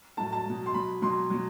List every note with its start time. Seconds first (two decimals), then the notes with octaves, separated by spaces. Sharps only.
0.17 A2 F#3 A5
0.33 A5
0.45 B2 F#3
0.66 C6
0.74 B2 F#3 B5
1.02 B2 F#3 C6
1.30 B2 F#3